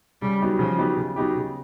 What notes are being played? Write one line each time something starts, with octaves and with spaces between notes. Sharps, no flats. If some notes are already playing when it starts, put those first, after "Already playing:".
C#3 G3
F#3 B3 D#4 G4
C#3 F3
F#3 B3 D#4 G4
C#3
F#3 B3 D#4 G4
C#3